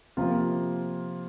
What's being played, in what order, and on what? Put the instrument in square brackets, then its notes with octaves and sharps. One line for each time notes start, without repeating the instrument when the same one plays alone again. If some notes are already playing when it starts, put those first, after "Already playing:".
[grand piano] C3 F3 A#3 F4